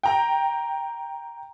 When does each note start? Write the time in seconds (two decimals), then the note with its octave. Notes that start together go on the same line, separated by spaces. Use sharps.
0.03 G5 A#5